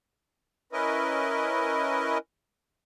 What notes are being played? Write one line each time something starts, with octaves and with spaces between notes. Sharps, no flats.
C#4 E4 A#4 B4 D#5